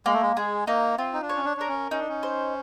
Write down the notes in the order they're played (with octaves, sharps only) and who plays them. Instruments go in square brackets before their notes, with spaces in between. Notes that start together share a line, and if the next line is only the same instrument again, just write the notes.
[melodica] G#3 [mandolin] A#3
[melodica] A3
G#3
[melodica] G#3 [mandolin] G#4
[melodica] A#3 [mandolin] D#4
[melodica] C4 [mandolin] F4
[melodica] D#4
D4
[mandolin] C#5
[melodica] C#4
D4
[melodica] D4 [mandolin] A#4
[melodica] C#4
[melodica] C#4 [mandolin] D#4
[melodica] D4
C#4
[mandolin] C5